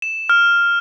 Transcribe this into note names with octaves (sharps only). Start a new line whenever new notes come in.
E7
F6